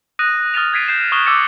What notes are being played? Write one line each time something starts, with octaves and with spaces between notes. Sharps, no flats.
D#6 F#6 A#6 D#7
D#6 F6 A6 A#6 D#7 F7
G#6 A6 B6 C7 D7 D#7
G6 C7 E7
C#6 D#6 F#6 E7 G7
D6 E6 G#6 A6 C#7